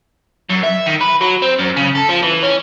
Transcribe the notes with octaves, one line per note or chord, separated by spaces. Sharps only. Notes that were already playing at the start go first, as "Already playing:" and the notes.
F#2
E5
D#3
B4
F#3
C4
F#2
C#3
A4
F3
E3
C#4